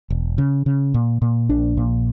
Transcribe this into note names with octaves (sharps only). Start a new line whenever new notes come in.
E1
C#3
C#3
A#2
A#2
A#1 D4
A#2